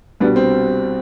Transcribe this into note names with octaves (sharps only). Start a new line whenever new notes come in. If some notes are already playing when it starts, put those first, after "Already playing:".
C2 B2 G3 B3 D4
C4